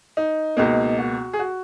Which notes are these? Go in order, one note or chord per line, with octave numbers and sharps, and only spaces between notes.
D#4
C#2 B2 A#3 D#4
F#4
G#4
F#4